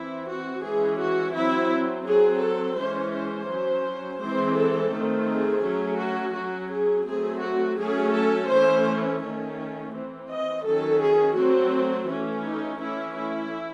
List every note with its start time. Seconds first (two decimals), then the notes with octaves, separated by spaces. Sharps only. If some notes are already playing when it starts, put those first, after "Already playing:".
Already playing: E3 C4 E4
0.27 F#4
0.63 E3 G#3 C#4 G#4
0.98 F#4
1.34 F#3 C4 E4
2.06 F#3 C4 G#4
2.41 A4
2.78 E3 G#3 C#4 C5
3.13 C5
3.49 F#3 C#4
4.21 E3 G#3 C4 C5
4.57 A4
4.92 D#3 A3 C4
5.28 G#4
5.63 F#3 A3 C#4
6.00 F#4
6.35 F#3 C#4 F#4
6.71 G#4
7.07 F#3 A3 C4 G#4
7.42 F#4
7.79 F#3 A3 C#4 G#4
8.14 A4
8.50 E3 A3 C#4 C5
9.22 D#3 A3 C#4
9.93 E3 C4
10.29 D#5
10.64 D#3 F#3 C#4 A4
11.01 G#4
11.36 F#3 A3 C4 F#4
12.08 E3 A3 C#4
12.43 D#4
12.79 E3 A3 C#4 E4
13.16 E4